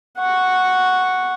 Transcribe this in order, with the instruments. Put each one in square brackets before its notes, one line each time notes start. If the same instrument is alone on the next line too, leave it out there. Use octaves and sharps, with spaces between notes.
[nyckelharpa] F#5 C#6